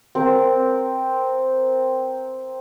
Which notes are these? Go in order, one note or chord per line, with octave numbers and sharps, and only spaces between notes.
C4 A#4